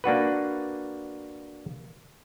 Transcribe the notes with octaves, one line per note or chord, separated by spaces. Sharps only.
A#3 D4 F#4 B4